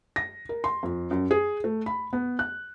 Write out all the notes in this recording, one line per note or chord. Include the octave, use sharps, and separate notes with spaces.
A#6
A#4
C6
F2
F#2
G#4
A3
B5
B3
F#6